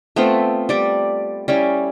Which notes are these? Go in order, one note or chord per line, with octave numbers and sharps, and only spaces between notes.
A3 B3 C4 F4
G3 D5
G3 C#4 E4